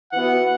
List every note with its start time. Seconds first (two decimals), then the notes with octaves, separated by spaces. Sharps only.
0.12 E3 B3 F#4 F#5